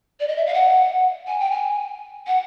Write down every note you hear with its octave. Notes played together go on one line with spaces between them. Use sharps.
D5
D#5
E5
F5
F#5
G#5
G5
G#5
F#5